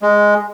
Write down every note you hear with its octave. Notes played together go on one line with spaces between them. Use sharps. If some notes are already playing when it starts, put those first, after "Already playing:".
G#3